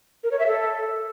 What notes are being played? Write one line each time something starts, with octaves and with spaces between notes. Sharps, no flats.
A#4
C#5
E5
A4